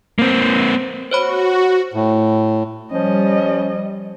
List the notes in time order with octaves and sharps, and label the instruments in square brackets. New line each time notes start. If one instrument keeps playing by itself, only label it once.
[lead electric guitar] A#3 C4
[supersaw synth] F#4 [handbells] C5 C#5 B5
[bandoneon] A2
[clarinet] F3 [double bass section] G3 [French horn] C#4 [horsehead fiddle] D#5